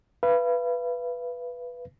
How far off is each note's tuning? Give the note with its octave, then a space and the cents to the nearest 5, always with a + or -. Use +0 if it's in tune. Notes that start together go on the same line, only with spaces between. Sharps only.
B4 +0 F5 -40